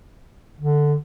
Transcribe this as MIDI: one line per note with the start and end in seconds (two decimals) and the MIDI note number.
0.61 0.96 50